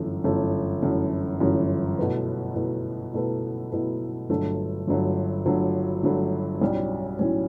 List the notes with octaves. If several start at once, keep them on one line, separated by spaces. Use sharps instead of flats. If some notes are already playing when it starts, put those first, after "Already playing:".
Already playing: G1 F#2 E3 A3
G1 F#2 E3 A3
G1 F#2 E3 A3
G1 F#2 E3 A3
B2 A3 E4 B4
B2 A3 E4 B4
B2 A3 E4 B4
B2 A3 E4 B4
G1 G2 F#3 A3
G1 G2 F#3 A3
G1 G2 F#3 A3
G1 G2 F#3 A3
B1 A2 G3 C#4
B1 A2 G3 C#4